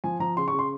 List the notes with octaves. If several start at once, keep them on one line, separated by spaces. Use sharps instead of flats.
F3 G#5
F3 A#5
C#3 C6
C#6
C#3
C6